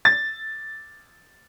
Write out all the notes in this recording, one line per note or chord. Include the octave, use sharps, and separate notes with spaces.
A6